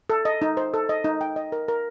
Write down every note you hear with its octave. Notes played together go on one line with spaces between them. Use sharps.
A4
D#5
D#4
C5
A4
D#5
D#4
G5
D#5
A#4
A#4